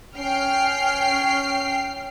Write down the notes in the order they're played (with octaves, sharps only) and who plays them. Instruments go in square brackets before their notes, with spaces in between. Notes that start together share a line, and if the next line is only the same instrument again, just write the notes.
[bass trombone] C#4 [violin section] G5 F6 C7